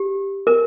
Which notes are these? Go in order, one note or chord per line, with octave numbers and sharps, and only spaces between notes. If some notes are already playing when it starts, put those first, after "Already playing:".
Already playing: G4
A#4